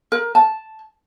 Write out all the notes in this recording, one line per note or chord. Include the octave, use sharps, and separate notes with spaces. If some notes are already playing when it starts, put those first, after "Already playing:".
A#4
A5